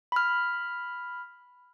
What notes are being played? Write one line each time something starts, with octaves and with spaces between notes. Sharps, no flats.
B5 F6